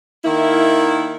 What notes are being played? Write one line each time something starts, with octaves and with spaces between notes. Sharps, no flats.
D#3 A#3 E4